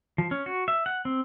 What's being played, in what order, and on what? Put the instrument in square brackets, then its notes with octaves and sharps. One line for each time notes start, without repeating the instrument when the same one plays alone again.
[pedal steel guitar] F3
C#4
F#4
E5
F#5
C4